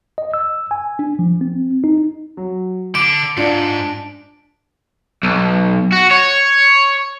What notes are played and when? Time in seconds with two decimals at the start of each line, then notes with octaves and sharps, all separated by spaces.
0.18 D#5
0.34 E6
0.71 G#5
0.99 D4
1.19 F3
1.41 C4
1.84 D#4
2.37 F#3
2.95 D3 D6 D7
3.37 G#2 D4 F4 D5
5.23 B1
5.92 F#4
6.11 C#5